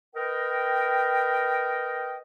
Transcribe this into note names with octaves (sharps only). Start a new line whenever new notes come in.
A#4 B4 D#5 G5